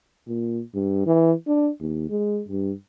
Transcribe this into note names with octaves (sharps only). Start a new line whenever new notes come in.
A#2
G2
E3
D4
D#2
G#3
G2